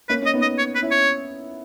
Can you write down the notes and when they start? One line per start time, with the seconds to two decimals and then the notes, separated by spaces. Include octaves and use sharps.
0.09 A#3 C#4 B4
0.22 C#4 D#5
0.34 B3 D#4
0.42 D#5
0.58 C#5
0.75 B4
0.82 C#4 E4
0.91 C#5